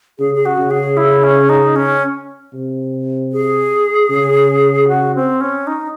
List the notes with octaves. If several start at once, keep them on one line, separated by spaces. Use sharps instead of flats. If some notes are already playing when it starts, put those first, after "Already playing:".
C#3 G#4
G#4
F#4
C#3
G#4
E4
C#4
D#4
C#4
C3
G#4
C#3
F#4
C4
C#4
D#4